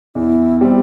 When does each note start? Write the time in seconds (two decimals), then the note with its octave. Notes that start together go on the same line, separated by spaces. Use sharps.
0.15 E2 E4
0.61 B2 G3 C4